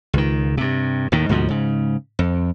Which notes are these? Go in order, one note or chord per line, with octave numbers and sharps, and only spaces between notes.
C#2 D#3
G2 C3
D#2 A2 D#3
D2 G#2 B2 F3
G#2 C#3
F2